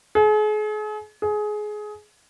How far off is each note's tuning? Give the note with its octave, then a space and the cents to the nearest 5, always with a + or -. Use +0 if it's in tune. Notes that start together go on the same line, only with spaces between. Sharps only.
G#4 +40
G#4 +20